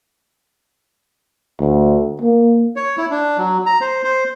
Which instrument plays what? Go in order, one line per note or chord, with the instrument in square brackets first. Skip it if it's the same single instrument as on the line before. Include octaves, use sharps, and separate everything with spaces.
[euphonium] D2
A#3
[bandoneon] C#5
E4
D4
F#3
A#5
C5
C5